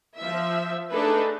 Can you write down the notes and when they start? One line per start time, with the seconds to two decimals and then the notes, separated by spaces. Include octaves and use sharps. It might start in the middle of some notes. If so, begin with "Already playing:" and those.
0.19 F3 E5
0.92 A3 D4 D#4 G#4 A4 B4